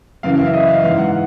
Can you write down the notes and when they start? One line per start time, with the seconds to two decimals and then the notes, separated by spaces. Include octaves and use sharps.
0.23 F#2 C#3 E3 F5
0.38 F5
0.46 E5
0.53 D#5
0.68 F5
0.84 G#2 E3 F5
0.98 F#5